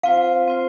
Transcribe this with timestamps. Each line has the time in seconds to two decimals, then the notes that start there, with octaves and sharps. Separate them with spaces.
0.03 C4 F4 C5 F5
0.48 C4 F4 C5